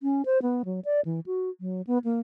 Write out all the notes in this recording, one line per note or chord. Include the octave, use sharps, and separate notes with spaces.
C#4
C5
B3
F#3
D5
E3
F#4
F#3
B3
A#3